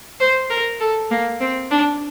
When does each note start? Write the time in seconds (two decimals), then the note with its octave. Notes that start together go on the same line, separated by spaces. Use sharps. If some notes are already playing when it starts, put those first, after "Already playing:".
0.20 C5
0.51 A#4
0.80 A4
1.11 A#3
1.41 C4
1.71 D4